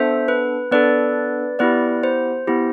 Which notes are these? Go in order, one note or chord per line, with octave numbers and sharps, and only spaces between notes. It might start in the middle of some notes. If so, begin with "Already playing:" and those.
Already playing: B3 D4 A4 C5 E5
B4
B3 D4 A4 B4 D5
B3 E4 G4 B4 D5
C5
B3 E4 G4